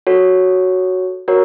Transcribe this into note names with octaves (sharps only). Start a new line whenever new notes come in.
F#4 A4 C#5
F#4 A#4 C#5